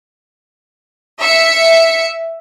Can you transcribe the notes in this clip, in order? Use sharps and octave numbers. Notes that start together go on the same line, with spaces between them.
E5 C#7